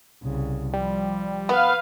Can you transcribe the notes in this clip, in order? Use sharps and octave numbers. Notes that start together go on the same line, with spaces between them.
C2 C#3
F3 G3
B3 B4 F5